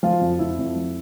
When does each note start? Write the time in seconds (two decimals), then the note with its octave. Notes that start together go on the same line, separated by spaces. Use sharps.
0.03 F3 F4
0.21 F2
0.39 F2 E4
0.59 F2
0.76 F3